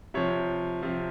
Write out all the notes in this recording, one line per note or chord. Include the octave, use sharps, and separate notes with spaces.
C3 F3 C#5
C3 F3